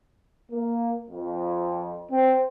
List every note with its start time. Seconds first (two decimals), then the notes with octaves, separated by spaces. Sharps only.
0.52 A#3
1.09 F2
2.12 C4